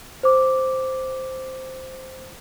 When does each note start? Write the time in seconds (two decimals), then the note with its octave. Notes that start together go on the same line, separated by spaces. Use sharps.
0.23 C5 D6